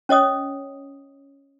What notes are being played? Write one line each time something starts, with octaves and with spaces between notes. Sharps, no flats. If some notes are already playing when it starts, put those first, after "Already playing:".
C#4 C#5 D#5 D#6